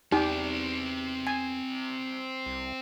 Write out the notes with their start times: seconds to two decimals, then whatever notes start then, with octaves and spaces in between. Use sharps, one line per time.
0.12 E2 C4 D#4 G4 D5
1.27 G#5
2.46 C2